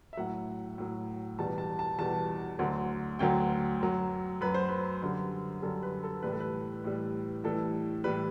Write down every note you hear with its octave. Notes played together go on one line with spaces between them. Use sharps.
E5
A2 F#3 F#5
A2 F#3
E2 B2 G3 A5
A5
A5
E2 B2 G3 A5
D2 D3 F#3
D2 D3 F#3 G5
F#2 F#3
F#2 F#3 B4
C5
B4
F#2 D3 G3
F#2 D3 G3 A4
B4
A4
A2 E3 G3 B4
A4
B4
A2 E3 G3
A2 E3 G3 A4
A2 E3 G3 B4